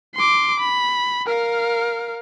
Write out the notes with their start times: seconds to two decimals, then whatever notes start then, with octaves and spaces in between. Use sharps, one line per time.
0.15 C6 D6
0.60 B5
1.26 A#4 F5